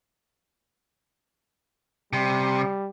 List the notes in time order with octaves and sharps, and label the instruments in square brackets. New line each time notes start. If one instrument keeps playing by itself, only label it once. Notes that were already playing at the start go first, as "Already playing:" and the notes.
[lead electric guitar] C3 [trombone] G3